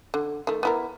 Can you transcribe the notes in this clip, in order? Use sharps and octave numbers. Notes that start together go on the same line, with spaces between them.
D3
D#3 A3
B3 E4 A#4